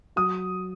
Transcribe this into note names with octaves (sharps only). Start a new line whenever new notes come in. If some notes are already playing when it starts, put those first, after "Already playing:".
F#3 D#6